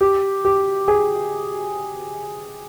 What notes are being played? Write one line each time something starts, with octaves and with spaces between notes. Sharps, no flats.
G4
G4
G#4